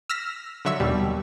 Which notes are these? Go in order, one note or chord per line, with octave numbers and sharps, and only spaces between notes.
E6 F6 A#6 B6
D3 F#3 E5 C#6 E6
D#2 B2 G3